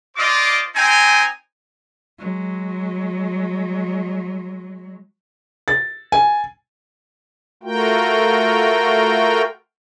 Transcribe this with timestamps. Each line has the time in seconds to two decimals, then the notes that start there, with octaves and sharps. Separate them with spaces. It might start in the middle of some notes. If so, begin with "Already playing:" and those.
0.17 F4 C5 D5 D#5 D6
0.76 C4 D#4 G5 G#5
2.19 F#3 G#3
5.68 A6
6.12 G#5
7.63 A3 F4 F#4 A#4 G5